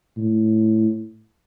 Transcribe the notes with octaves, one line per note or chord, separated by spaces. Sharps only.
A2